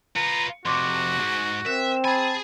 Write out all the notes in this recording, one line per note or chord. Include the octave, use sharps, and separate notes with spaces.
F4 B4 A#5 C#7
F2 C3 F#4 C6 D6
D2 G#2
C4 A#4 E5 F#6
G#4 G#5 A5 B5